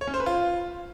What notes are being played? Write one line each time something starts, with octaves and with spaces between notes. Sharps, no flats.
C#5
C#4
C5
B4
F4